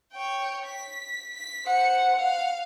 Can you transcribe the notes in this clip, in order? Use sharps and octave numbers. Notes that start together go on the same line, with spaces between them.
C#5 G5
B6
B6
C5 F#5 C#7
F5